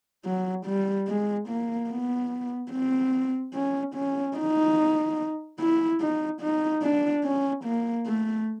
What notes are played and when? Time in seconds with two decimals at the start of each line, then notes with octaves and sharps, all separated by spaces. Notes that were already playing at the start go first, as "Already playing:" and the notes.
0.25 F#3
0.66 G3
1.08 G#3
1.49 A#3
1.90 B3
2.71 C4
3.55 C#4
3.95 C#4
4.36 D#4
5.60 E4
6.01 D#4
6.42 D#4
6.82 D4
7.24 C#4
7.64 A#3
8.06 A3